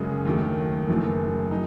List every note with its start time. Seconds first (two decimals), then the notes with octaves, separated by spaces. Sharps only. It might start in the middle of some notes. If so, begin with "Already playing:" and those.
Already playing: F#1 F#2 C#3 G#3
0.25 D#2 D#3 F#3 A3
0.88 F#1 F#2 E3 A3
1.51 D#4